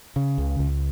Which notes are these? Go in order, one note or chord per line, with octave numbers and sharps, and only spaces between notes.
C#3
C#2
C#2